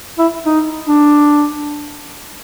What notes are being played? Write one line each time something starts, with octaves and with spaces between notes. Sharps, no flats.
E4
D#4
D4